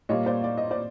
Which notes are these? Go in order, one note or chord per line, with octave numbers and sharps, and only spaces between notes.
A#2 G3 A#3 C#5 D#5
C5 D5
D5
D#5
C5 D5